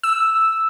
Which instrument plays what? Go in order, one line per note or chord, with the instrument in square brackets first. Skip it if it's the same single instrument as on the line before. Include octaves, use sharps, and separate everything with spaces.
[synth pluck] E6